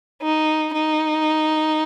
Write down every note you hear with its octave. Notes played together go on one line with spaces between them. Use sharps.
D#4
D#4